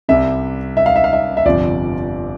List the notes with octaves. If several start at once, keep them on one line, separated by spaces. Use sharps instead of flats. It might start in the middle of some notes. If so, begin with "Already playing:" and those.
C2 C3 G3 E5
E5
F5
E5
F5
E5
E5
G1 F2 C3 F3 D5